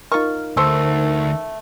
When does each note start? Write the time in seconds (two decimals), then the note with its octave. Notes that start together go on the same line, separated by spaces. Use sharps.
0.12 D#4 F4 A#4 C#6 F6
0.57 D2 A3 A4 C5 E6